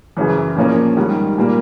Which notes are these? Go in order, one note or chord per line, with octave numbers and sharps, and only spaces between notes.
F#2 C#3 E3
A#2 F3 A#3 C#4
G#2 D#3 G3
A#2 G3 A#3